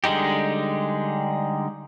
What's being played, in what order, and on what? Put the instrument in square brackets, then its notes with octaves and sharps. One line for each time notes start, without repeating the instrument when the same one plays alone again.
[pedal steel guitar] D3 G3 G#3 D#4 G4